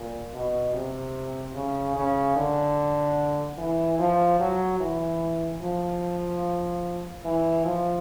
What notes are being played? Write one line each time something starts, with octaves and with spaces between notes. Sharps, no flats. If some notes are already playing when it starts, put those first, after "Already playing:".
Already playing: A#2
B2
C3
C#3
C#3
D3
E3
F3
F#3
E3
F3
E3
F3